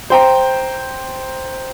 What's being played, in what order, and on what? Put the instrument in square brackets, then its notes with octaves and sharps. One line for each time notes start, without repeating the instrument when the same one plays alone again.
[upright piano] C5 G5 A#5